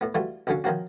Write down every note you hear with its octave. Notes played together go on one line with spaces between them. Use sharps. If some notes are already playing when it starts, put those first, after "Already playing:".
A2 B3
E3 G3 A3 F4 F#4
C2 A#2 D3 F#3 C#4 F5
D#3 F3 F#3 A#3 C4 F#4